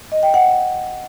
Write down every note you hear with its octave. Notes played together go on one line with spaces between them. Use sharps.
D#5
G5
F#5